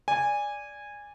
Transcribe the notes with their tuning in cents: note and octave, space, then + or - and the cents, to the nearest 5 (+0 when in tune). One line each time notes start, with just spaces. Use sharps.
D5 -5 G#5 -15